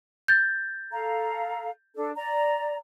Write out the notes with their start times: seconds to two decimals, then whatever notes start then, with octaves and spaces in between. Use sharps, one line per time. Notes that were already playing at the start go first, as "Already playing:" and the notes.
0.28 G6 A6
0.91 A4 F5 A#5
1.95 D4 A4
2.16 D5 A#5